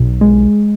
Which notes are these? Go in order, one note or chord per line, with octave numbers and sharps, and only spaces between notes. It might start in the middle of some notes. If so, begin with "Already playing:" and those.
Already playing: B1
G#3